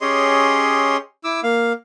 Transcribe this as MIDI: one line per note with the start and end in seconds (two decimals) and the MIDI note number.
0.01 0.97 61
0.01 0.97 67
0.01 0.97 68
0.01 0.97 73
0.01 0.97 75
0.01 0.97 84
1.24 1.40 64
1.24 1.40 86
1.24 1.40 88
1.43 1.73 58
1.43 1.73 77